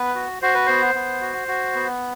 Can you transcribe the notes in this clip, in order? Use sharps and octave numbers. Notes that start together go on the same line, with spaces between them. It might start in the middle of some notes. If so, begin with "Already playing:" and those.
Already playing: B3 B4
F#4
F#4 C5
B4
B3 C5
B3
F#4
F#4
B3